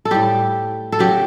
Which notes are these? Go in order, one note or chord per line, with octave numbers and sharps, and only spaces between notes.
A4
A2 G3 G4
A4
C#3 F#3 A3 G4